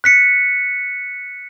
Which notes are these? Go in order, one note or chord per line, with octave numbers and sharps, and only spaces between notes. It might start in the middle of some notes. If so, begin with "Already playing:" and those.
F#6 B6 C#7